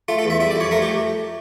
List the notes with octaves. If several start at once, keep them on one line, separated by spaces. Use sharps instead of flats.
A3 F4
A4
E2
E5
G3 E5
D5
F2 C#5
A3 A#4
G4